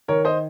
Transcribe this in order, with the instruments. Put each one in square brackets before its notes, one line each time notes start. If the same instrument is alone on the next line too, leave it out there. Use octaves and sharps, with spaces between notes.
[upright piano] D#3 A#4 C#5
C5 D#5